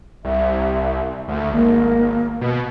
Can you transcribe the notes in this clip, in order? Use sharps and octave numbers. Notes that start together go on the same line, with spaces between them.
C2 E5
D2 A3
G#1 A#3
B2